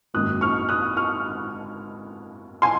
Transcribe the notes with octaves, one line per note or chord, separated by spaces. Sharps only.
G#1 F#2 D#3 F#3 A#3 D#6 F#6
C#6 F6
D#6 F#6
C#6 F6
G#5 C6